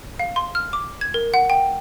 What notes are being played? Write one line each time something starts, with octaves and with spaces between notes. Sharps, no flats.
F5
C6
F6
D6
G#6
A#4
F#5
G5